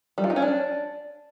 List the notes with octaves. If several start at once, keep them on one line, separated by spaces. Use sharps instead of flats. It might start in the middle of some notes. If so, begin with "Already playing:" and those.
G3
F4
D#4
C#4
D4